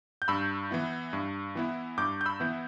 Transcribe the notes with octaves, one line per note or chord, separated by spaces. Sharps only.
G6
G2 B5 E6
E3 B3 E4
G2
E3 B3 E4
G2 D6 G6
G6
B5 E6
E3 B3 E4